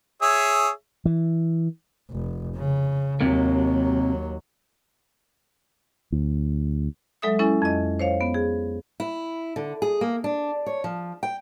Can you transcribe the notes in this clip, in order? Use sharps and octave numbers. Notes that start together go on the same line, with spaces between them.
G#4 C#5 E5
E3
F1
C#3
D#2 C3 F#3 A#3
D2
F#3 G#3 A4 E5 D#6
C#4 E4 A4 G#5
F2 D#5
C5 C#5 F5
B3
G#4
E4
D3
G#4
A#3
D4
C#5
F3
G5